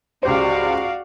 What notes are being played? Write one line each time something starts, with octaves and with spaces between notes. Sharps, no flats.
C#2 F#4 G4 C5 D5 F5